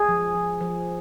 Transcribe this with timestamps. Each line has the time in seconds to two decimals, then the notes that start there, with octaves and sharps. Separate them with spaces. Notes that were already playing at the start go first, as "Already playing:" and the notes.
Already playing: G#4
0.09 F3
0.35 F3
0.61 F3